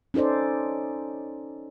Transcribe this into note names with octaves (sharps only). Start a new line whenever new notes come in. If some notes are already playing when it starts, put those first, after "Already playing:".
C#4 D#4 A4 C5 D5